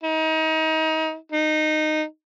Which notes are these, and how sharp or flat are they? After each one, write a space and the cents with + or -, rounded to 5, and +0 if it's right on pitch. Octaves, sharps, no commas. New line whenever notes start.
D#4 +30
D#4 -15